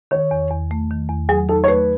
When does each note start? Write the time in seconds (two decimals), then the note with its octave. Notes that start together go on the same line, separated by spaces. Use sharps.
0.11 D#3 C#5
0.31 E2
0.50 E2
0.71 A3
0.91 D#3
1.09 E2
1.29 F#3 G#4
1.49 D#4 A4
1.64 C#5
1.68 A3 B4